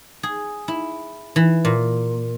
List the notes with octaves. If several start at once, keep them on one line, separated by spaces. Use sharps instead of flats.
G#4
E4
E3
A#2